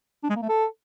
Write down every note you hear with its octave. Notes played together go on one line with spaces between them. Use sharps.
D4
G#3
A#3
A3
A4